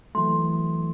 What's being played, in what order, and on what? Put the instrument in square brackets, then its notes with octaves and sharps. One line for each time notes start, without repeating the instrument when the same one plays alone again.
[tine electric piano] E3 F#3 A3 [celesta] C6